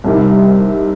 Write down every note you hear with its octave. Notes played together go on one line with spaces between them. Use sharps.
C2 C3 D#3 G3